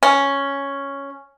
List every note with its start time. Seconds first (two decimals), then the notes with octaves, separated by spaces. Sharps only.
0.03 C#4